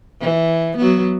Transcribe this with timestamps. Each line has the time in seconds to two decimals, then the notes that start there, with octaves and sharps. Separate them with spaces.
0.21 E3
0.78 F#3 B3